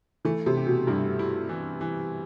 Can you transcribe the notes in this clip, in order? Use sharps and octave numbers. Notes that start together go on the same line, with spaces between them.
E3 A3
C3
G4
B2
G2 E4
E4
E3
E3